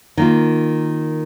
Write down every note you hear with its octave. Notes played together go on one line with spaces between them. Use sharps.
D#3 A#3 F4